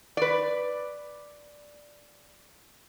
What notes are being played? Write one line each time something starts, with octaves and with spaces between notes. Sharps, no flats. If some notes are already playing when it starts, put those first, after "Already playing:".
B4 D5